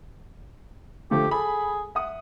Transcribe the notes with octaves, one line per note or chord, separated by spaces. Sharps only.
D3 F3 A3 G4
G#4 A4 B5
E5 F#5 D#6